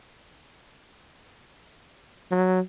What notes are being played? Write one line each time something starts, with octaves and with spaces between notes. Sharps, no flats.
F#3